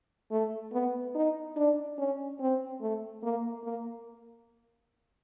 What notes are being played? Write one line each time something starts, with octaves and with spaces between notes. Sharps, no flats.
A3
B3
D#4
D4
C#4
C4
A3
A#3
A#3